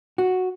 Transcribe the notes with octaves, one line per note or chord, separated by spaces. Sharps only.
F#4